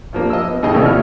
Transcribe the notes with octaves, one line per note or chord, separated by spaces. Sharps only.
G2 F3 A#3
D#5 E6
B3
D#2 A2 C#3 G#4 D#5 G5
C2 D#3 E3 C#5 D5
A#2 F3 C#5 E5 F6